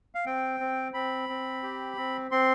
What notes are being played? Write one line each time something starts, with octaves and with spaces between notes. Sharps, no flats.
F5
C4 G5
C4
C4 B5
C4
G4
C4
C4 C6